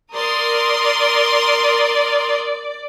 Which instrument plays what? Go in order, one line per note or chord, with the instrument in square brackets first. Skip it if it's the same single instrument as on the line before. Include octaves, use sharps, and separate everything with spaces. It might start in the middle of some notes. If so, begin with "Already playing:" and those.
[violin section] A#4 C6 D#6 [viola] D5